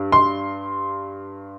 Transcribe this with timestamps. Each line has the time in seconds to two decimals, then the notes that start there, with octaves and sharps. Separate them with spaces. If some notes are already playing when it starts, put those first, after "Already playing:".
Already playing: G2
0.12 C6